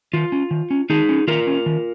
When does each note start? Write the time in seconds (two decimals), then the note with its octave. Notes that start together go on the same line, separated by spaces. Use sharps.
0.13 D#3 F4
0.32 C#4
0.51 D#3
0.70 C#4
0.90 D#3 D#4 G#4
1.09 C#4
1.27 D#3 F4 A#4
1.47 C#4
1.66 D#3